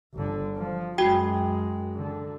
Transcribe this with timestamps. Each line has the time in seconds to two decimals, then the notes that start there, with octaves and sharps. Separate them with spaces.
0.14 G1 D3
0.57 F3
0.98 F#2 G#3 F#4 G5
1.95 D3